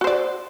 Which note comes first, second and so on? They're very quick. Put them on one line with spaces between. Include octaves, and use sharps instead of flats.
F#4 C5 D5